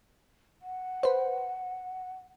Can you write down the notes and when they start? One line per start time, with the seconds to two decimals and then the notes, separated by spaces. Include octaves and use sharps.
0.62 F#5
1.03 B4 C5